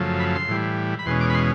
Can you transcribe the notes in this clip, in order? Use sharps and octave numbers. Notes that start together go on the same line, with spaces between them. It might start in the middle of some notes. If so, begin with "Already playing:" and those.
Already playing: F#2 C#3 F3 A3
B5
C6
A2 E3 G3
B5
E2 B2 G#3 C#4 C6
D6
B5
C6